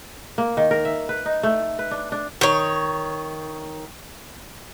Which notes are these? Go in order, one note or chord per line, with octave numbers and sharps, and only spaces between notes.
A#3
D#3
A#4
E5
B4
D#4
A3
B4
D4
D4
D#3 C#5